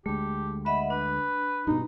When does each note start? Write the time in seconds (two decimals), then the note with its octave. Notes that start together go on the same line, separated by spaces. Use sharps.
0.06 D2 G#3 A3 G4
0.66 D#5 E5 F#5 B5
0.90 D4 B4
1.67 G2 B2 D#4